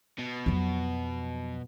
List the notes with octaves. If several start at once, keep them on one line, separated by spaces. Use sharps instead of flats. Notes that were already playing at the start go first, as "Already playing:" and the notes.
B2
F2 F#3